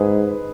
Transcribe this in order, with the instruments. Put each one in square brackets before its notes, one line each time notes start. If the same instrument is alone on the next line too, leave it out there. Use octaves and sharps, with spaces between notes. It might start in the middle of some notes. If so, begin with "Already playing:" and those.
Already playing: [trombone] G#2 [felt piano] G#4 B4